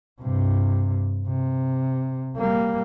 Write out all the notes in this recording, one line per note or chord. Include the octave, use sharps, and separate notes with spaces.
G2 C3
C3
G3 A#3